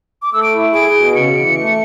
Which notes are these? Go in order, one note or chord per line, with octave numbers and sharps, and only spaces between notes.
D6
A3 E6
D7
E4
G#4 D7
B2
C#3 C#7
E3
A3